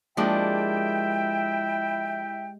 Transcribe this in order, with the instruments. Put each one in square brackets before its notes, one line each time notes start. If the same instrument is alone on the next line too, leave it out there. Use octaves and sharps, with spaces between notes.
[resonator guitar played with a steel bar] F3 A#3 D4 [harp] G#3 G4 [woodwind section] E4 E5 G5